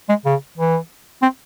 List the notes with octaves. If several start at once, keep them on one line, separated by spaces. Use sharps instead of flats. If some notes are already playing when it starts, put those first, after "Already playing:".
G#3
C#3
E3
C4